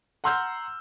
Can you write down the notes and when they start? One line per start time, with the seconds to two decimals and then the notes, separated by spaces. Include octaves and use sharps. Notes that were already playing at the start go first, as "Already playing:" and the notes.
0.24 F#5 A#5 C6 E6 F6 G6